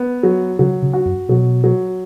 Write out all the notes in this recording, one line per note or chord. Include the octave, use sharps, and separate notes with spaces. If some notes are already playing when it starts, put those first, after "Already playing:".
Already playing: B3
F#3
C#3 F#3
C#3
F#4
F#2
B2 F#3
F#3